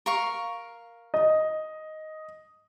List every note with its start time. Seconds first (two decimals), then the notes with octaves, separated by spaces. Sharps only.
0.06 A#4 F5 C#6
1.14 D#5